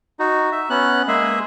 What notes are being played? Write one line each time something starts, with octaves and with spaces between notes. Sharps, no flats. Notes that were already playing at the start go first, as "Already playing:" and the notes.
D#4 F#4
E5
B3 C#4 F#6
G#3 A#3 G#4 E5